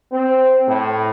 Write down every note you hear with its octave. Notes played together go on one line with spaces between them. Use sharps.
C4
A2